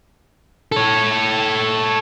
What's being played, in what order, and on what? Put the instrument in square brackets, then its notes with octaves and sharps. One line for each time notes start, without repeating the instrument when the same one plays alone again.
[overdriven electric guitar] A4 C#5